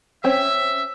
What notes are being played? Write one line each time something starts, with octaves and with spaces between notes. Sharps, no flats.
C4 C#4 E5